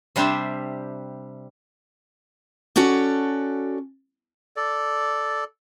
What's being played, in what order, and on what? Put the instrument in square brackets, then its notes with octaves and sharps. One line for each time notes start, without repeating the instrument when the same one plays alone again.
[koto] C3 G3 D4 G4 C5 E5
[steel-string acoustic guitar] C#4 F#4 A4 C#5 D5
[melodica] A4 D5